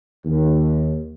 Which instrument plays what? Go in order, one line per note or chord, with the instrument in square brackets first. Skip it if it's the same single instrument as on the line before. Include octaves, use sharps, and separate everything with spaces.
[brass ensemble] D#2